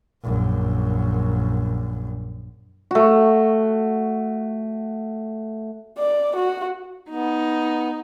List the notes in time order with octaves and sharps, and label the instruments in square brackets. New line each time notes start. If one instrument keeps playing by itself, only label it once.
[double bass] A#1 F#2
[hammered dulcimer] A3 F#4
[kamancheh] D5
F#4
[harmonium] B3 [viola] D#4